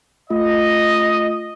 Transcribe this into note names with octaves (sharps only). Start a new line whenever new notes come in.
A3 F4 D#5